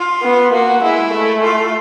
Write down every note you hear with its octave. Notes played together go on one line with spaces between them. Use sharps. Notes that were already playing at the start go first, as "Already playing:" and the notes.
Already playing: F4
B3
A#3 F#4
G#3 E4
A3
F4